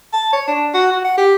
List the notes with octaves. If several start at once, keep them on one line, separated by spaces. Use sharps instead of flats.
A5
C#5
D4
F#4
F#4
F#5
G4